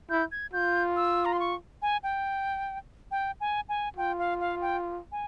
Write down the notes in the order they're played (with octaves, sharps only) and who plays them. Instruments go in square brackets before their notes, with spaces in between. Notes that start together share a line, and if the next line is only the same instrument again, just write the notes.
[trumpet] E4 [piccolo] G6
[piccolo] G#6
[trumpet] F4 [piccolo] G6
[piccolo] E6
A#5
C6
C#6
G#5
G5
G5
G#5
G#5
[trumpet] F4 [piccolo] G5
[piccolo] F5
F5
G5
G#5